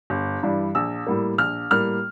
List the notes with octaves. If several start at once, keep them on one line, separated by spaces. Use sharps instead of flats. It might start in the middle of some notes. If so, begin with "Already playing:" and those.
G1
G2 E3 G3 D4
A#1 E6
A2 G3 A#3
A#1 F6
A2 G3 A#3 F6